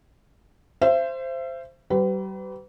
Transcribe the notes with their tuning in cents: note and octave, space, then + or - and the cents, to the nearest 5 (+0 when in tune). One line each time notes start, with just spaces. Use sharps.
C5 +0 E5 +40
G3 -35 B4 +35